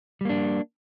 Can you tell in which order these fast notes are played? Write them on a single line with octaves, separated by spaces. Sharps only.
G3 A#3 D4